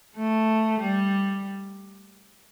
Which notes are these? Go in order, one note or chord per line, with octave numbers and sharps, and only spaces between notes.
A3
G3